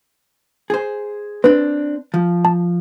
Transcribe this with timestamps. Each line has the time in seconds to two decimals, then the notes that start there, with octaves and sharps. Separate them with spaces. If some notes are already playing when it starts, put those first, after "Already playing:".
0.70 G#4 C5
1.44 C4 D4 B4
2.14 F3
2.45 A5